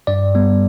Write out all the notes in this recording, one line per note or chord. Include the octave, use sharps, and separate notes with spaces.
G2 D5
G3 B3